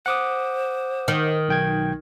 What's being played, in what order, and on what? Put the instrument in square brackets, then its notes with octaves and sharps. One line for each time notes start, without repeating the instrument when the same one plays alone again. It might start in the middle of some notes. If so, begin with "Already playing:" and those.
[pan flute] C5 [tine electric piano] F#5 D6 D#6
[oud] D#3
[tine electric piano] B1 G5 G#6